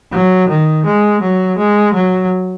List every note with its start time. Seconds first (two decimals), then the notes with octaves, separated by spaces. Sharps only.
0.12 F#3
0.48 D#3
0.85 G#3
1.21 F#3
1.58 G#3
1.94 F#3